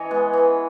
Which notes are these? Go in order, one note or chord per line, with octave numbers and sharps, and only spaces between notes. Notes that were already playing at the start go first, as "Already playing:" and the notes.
Already playing: E3 C#5 D#5
G#3 B3
E3